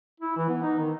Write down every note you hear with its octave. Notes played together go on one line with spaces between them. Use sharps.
E4
E3
B3
D#4
D#3